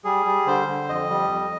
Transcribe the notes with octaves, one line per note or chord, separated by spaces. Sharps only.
G3 G#4
G3
D3 C5
D3
F2 D#5
G3
F2